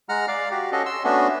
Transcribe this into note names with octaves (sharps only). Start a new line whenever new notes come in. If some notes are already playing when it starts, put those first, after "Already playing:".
G#3 F#5 A#5 F6
D5 F5
F#4 G4
C#4 F#4 A4 D#5
C6 E6
A3 B3 C#4 D4 F#4